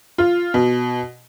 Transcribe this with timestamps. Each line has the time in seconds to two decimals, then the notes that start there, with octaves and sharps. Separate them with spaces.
0.18 F4
0.54 B2